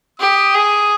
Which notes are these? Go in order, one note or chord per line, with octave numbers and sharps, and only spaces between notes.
G4 D#6
G#4